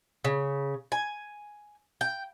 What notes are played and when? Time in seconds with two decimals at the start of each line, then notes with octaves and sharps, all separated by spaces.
0.25 C#3
0.92 G#5
2.01 G5